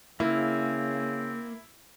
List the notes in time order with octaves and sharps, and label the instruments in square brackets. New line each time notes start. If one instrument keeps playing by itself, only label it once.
[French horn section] C#3 [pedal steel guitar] A#3 [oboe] C4 [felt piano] E4